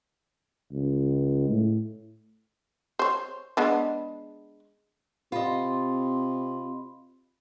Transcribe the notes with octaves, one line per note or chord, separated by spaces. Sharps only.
C#2
A2
C5 C#5
G#3 B3 D4
C3 C4 F4 D#5 B5 C6